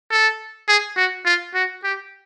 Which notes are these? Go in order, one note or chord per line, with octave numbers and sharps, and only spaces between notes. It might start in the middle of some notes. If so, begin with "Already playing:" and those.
A4
G#4
F#4
F4
F#4
G4